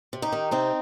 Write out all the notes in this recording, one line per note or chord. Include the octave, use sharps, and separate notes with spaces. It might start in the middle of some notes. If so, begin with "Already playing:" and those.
C3
D#4 G4
D#3
C3 C4 D#4